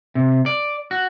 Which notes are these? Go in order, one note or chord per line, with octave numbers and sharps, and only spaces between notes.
C3
D5
F#4